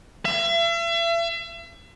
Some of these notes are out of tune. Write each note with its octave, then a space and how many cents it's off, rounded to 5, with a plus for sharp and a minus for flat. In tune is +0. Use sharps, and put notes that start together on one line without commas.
E5 +40